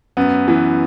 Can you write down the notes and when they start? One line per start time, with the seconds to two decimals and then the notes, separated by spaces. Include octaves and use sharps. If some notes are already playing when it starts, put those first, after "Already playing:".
0.17 F#2 B3
0.48 E3